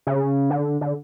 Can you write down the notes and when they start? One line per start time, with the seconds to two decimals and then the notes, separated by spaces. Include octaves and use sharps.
0.07 C#3
0.50 D3
0.81 D3